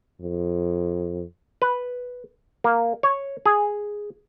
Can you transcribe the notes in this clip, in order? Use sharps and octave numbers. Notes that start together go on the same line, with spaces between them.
F2
B4
A#3
C#5
G#4